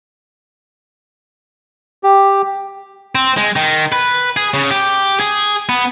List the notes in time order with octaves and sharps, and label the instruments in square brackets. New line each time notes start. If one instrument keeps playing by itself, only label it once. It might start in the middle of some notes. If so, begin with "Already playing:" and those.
[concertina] G4
[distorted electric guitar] C4
G#3
D#3
B4
G#4
C#3
G4
G#4
B3